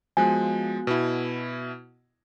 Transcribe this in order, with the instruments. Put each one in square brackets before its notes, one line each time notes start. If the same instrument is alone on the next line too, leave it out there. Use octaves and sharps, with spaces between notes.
[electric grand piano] F3 G#3 [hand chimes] B3 F#4 F#6 [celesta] G#5
[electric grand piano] B2 E4